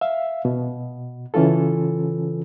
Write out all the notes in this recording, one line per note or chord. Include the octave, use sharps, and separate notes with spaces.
E5 F5
B2
C#3 E3 C#4 F4 A4